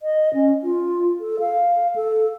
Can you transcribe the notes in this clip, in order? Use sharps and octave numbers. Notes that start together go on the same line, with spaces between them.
D#5
C#4
F4
A4
F5
A4